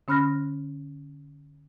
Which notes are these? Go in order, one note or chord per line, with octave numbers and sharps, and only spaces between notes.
D3 C#4 B5 F6 F#6 A#6